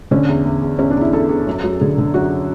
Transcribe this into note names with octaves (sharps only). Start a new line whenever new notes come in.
D3 C#4
E2
E2
E2
E2 C#4
D4
E2 E4
E2 A4
E2
F#2
F#3
D3 G#4
D3
F#2 F#4